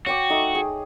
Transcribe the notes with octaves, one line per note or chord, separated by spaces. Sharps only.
F#4 C#5 G5 D6
A3 D#4
G#4